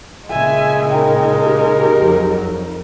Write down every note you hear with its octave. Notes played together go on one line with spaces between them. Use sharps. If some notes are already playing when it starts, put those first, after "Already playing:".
A#2 C#3 G#3 E5 G#5
D#4 A#4 G5
G4
F2 F#3
F2